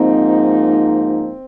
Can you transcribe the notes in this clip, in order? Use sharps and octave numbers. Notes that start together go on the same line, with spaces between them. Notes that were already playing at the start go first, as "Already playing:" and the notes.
Already playing: G#2 F3 A#3 C4 D#4